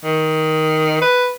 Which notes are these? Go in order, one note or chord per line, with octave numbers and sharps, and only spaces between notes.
D#3
B4